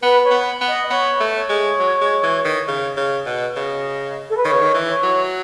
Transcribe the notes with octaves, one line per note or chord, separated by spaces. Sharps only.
B3 B4
C#5
B3
B3
D#5
B3 C#5
A3
C#5
G#3
F#3
G#3
E3
D#3
C#3
C#3
B2
C#3 D#5
A4
B4
D#3 C#5
C#3
D#3
E3
C#5
F#3